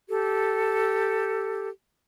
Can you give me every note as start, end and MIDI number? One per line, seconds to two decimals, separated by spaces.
0.08 1.69 67
0.08 1.69 69